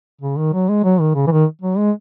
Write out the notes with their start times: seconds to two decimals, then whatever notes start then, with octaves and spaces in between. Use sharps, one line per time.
0.21 C#3
0.37 D#3
0.53 F#3
0.69 G#3
0.84 F#3
1.00 D#3
1.15 C#3
1.27 E3
1.31 D#3
1.62 F#3
1.77 G#3